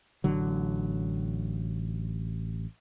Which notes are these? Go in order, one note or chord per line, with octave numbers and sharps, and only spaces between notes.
A1 D3 F#3